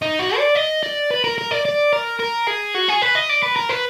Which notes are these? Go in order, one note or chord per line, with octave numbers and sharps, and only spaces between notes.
D#4
F#4
D5
D#5
D5
B4
A#4
A#4
D5
D5
A#4
A#4
G#4
F#4
G#4
B4
D#5
D5
B4
A#4
B4